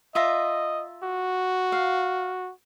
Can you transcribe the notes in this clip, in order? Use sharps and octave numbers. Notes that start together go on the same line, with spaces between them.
F4 D#5 E5 A#5
F#4
F5